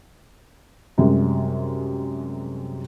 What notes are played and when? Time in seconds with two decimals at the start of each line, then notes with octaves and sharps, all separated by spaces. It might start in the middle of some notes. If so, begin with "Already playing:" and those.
0.98 F#2 C3 G3 G#3